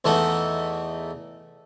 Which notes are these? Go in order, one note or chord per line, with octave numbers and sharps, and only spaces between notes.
E2 E3 A3 D#4 A4 F#5